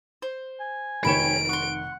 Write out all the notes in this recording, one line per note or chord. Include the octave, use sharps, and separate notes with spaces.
C5
G#5
F1 D#3 C#5 G5 B5 D7 E7
F#5 C6 C#6